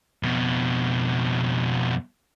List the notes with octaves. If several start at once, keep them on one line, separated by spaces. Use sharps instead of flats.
F2 B2